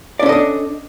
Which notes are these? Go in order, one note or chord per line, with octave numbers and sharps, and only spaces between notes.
C#4 D4 A4 D5 D#5